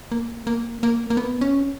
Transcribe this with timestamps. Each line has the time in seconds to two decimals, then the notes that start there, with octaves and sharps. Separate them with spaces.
0.12 A#3
0.47 A#3
0.83 A#3
1.10 A#3
1.17 B3
1.41 C#4